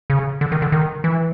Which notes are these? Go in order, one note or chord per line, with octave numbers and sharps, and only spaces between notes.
C#3
D3
D#3
D3
D#3
E3